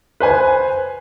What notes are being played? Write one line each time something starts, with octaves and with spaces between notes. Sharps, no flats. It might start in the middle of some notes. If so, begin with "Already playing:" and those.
B4 C5 G#5